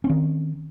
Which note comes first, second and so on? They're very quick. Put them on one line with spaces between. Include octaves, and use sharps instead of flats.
C#4 C4 D#3